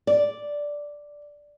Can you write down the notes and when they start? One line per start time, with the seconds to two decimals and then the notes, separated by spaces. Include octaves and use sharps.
0.07 D5